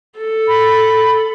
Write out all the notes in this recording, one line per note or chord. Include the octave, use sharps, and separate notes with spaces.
A4
B5